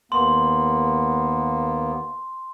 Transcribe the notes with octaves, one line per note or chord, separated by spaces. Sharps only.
D#2 A#3 B3 C6